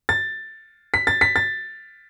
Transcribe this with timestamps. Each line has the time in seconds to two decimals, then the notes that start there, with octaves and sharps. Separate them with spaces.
0.09 A6
0.94 B6
1.07 A6
1.21 B6
1.36 A6